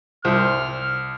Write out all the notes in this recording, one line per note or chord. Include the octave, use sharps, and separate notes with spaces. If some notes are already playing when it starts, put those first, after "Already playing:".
C2 C5 F6